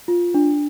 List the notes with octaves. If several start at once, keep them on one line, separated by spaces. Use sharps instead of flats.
F4
D4